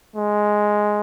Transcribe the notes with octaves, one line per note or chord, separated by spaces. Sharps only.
G#3